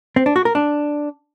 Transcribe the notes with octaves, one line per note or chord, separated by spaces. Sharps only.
C4
D4
F#4
A#4
D4